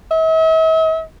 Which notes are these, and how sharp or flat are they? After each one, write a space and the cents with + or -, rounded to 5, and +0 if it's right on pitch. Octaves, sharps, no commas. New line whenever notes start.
E5 -45